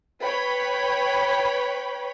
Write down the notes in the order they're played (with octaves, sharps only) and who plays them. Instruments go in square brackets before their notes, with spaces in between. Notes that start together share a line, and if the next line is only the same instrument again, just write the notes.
[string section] B4 C#5 G5 B5